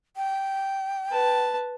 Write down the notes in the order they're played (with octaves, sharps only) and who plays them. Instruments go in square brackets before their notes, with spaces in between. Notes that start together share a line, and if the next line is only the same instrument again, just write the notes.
[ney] G5
[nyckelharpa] B4 A5